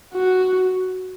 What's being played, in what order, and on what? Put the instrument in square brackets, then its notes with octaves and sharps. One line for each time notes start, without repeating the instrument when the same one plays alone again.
[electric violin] F#4